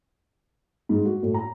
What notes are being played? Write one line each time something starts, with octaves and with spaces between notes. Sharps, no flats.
G#2
F#4
A2
A#5